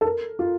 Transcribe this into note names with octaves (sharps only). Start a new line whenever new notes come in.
A4
A#4
F4